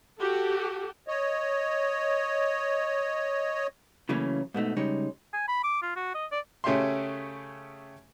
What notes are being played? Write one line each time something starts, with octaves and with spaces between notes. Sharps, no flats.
F#4 G4 A4
C#5 D#5
C#3 E3 F#3 A3 A#3 C#4
G#2 B2 A3 D#4
C#3 G3 G#3 D#4 C#5
G#5
B5
D6
F4
F#4
D#5
D5
C#3 A3 C#4 G4 E5 C6